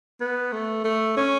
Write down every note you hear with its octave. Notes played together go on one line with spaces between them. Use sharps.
B3
A3
A3
C#4